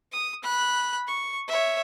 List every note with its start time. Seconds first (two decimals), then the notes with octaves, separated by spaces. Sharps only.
0.12 D#6
0.43 B5 F#6
1.07 C#6
1.48 C#5 E5